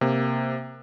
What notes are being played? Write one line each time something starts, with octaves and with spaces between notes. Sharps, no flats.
C3 A#3